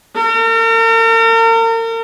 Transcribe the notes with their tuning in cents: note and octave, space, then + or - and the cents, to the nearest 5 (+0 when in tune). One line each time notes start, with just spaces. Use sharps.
A#4 -40